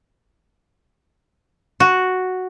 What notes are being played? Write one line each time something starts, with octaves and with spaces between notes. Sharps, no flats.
F#4